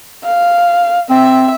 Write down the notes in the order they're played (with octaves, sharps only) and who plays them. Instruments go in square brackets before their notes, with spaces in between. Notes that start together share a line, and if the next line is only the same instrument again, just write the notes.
[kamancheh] F5
[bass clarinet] C4 [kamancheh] E5